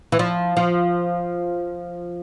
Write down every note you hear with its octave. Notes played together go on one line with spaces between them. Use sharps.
E3
F3
F3